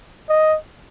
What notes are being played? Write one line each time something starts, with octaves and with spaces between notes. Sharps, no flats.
D#5